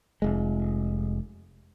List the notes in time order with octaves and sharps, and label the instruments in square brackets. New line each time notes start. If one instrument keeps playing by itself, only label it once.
[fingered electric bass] F1 G#3